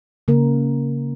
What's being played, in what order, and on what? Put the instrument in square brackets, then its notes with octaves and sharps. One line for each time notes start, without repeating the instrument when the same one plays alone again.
[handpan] C#3 A#3 A#4